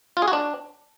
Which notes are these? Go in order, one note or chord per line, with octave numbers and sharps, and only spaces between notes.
F4
G#4
F#4
D4